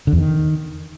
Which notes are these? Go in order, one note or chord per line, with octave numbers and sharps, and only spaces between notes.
D3
E2
D#3